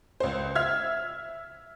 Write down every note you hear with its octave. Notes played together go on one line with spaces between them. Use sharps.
C#2 C5
E5 F6 G#6